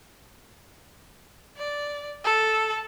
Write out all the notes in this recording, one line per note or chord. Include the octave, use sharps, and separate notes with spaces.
D5
A4